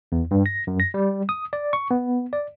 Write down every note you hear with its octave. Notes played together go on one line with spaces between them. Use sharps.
E2
G2
A#6
F#2
A#6
G3
D#6
D5
C#6
B3
D5